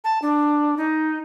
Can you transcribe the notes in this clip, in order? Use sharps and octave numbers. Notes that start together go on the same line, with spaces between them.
A5
D4
D#4